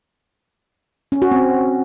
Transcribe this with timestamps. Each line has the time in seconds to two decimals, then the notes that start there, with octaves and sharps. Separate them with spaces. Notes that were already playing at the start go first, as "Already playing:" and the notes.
1.12 C#4
1.22 F#4
1.31 C4